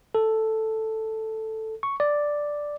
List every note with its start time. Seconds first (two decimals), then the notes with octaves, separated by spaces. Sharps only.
0.15 A4
1.83 C#6
2.00 D5